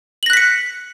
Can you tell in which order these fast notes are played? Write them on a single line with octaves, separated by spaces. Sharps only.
F#7 A#6 F#6 B6 C#7